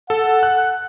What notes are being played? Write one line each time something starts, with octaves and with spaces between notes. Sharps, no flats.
A4 F#5
F#6